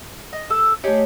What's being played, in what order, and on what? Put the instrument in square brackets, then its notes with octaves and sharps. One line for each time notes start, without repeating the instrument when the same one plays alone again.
[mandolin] D#5
A4 E6
[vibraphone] A3 C#5 [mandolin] D#4 G4 G#4